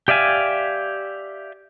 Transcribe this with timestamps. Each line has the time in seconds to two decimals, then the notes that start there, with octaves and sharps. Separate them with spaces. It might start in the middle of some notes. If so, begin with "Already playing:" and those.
0.08 G4 D5 E5 F5 G#5